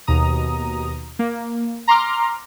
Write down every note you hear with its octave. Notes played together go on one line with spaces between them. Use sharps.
D#2 B2 A#5 D#6
A#3
A#5 C6 D6 F6